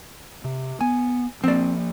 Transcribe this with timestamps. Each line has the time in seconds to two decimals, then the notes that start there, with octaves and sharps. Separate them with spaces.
0.44 C3
0.81 B3 G#5
1.44 F3 A#3 C4 D5